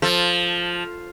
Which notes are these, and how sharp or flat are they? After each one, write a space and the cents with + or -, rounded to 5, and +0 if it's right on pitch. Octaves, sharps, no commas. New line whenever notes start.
F3 +0 A4 +0